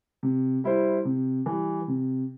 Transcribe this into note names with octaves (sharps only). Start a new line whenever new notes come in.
C3
G3 E4 C5
C3
E3 G3
C3